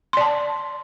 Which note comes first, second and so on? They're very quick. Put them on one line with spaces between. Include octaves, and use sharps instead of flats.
C6 D5 A5